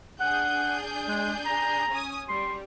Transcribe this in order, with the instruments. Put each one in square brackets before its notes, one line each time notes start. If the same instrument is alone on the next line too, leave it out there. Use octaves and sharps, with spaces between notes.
[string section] D4 G#4 G6 [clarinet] F#5
[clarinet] G#3
A#5
[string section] C#4 G#5 D#6
[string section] G3 [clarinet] C6